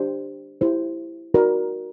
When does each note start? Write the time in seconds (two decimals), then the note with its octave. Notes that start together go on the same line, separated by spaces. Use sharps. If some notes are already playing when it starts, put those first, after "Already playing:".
Already playing: D4 G4 C5
0.61 E4 G4 C5
1.34 D#4 F#4 A#4 D5